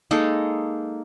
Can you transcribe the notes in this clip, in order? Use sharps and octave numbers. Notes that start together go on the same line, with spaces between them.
G#3 A#3 D#4 A4